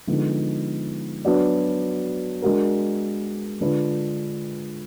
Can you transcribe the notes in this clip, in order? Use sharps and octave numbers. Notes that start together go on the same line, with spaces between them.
D3 F3 G#3 B3 D#4
F#3 B3 D4 F#4 D5
G#3 D4 F#4 A#4
D3 G#3 D4 F4 B4